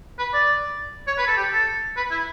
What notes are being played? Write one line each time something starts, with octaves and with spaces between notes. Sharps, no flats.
B4
D5
C#5
B4
A4
G4
A4
B4
E4